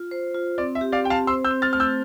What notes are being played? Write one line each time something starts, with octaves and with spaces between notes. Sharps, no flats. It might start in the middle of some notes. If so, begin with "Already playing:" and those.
Already playing: F4
C5
F4
C4 D5
E5
G4
D5 F5
C4 G5
F5 A5
C5 C6 E6
E6 G6
C4
F6 A6
A3 F6
E6 G6